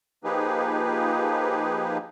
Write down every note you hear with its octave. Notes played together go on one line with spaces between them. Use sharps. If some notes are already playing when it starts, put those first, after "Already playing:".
F3 A#3 D#4 G4 G#4 B4